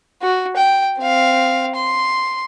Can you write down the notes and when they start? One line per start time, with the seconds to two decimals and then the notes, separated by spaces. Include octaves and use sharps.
0.22 F#4
0.57 G5
0.99 C4 F5
1.76 C6